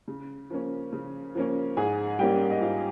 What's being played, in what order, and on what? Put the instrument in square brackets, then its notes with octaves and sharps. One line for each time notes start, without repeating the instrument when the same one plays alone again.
[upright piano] C#3
F3 A#3 C#4
C#3
F3 A#3 C#4
G#2 G#4 G#5
G3 A#3 C#4 G4 G5
D#5
G#2 F4 F5